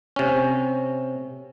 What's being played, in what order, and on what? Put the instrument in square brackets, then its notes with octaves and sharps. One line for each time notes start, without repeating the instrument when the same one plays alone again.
[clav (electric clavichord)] C3 C#4